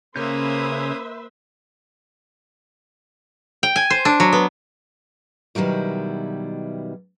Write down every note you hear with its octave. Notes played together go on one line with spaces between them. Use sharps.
C#3 A#3 C#4 B4 C5 E5 D#6 G6
G5
G#5
C5
D4
F#3
B3
B2 D#3 F#3 G3 E4